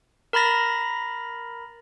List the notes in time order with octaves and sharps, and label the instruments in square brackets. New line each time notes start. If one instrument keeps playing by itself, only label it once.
[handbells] A#4 A#5 B5 A6 A#6